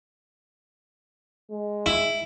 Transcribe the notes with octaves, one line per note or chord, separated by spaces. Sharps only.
G#3
E4